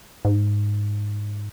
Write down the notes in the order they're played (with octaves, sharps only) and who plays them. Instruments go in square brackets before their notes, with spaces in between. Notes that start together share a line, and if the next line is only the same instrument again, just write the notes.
[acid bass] G#2